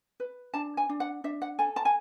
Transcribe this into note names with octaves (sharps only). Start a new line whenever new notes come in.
B4
D4 A5
G#5
D4
F#5
D4 E5
F#5
A4 G#5
A5
G#5